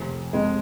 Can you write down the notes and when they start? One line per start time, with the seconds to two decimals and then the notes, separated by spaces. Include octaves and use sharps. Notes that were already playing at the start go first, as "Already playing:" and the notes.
Already playing: F1
0.33 F2 G#3